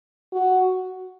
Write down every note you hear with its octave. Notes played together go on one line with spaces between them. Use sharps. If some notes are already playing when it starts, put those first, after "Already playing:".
F#4